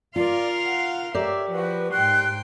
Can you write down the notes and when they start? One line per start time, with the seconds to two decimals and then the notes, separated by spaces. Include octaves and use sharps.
0.16 F4 A#4 D5 F5 C6
0.65 F#5
1.14 G4 A#4 C#5 D5 E5
1.51 F3 F#4 B4
1.91 G#2 G5 C6 F#6